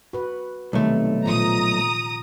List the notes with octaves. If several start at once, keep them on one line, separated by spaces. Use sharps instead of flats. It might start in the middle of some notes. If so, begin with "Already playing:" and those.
F#4 B4
B1 C3 D#3 G3 A3
A#2 F3 A#5 D#6